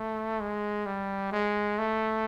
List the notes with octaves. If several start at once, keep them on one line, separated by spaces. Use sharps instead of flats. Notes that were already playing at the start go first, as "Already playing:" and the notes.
Already playing: A3
G#3
G3
G#3
A3